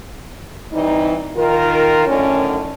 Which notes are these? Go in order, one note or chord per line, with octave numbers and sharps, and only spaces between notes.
C3 E3 G3 D#4
D#3 F4 A#4
F#2 A2 D3 D#3 C#4